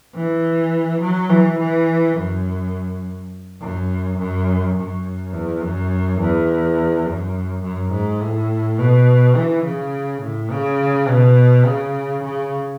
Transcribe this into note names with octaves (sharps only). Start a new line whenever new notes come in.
E3
F#3
E3
E3
F#2
F#2
F#2
F#2
E2
F#2
E2
F#2
F#2
G#2
A2
B2
E3
C#3
A2
C#3
B2
C#3
C#3